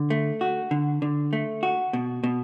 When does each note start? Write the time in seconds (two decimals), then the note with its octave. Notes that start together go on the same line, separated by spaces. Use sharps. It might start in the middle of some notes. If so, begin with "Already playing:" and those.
Already playing: D3
0.10 A3
0.41 F#4
0.71 D3
1.02 D3
1.33 A3
1.63 F#4
1.93 B2
2.24 B2